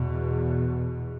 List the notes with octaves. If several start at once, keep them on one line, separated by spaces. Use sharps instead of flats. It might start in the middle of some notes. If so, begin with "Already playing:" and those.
Already playing: E2 B2